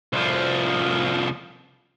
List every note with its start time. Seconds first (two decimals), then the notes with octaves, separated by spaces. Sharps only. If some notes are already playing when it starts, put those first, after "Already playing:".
0.13 C2 F3